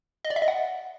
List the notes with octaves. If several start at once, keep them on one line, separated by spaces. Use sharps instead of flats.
D#5
D5
E5
D#5
F#5